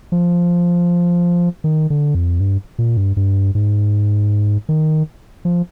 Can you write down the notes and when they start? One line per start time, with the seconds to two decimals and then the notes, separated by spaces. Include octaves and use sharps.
0.12 F3
1.64 D#3
1.90 D3
2.15 F2
2.40 G2
2.79 A#2
2.97 G2
3.17 G2
3.55 G#2
4.69 D#3
5.45 F3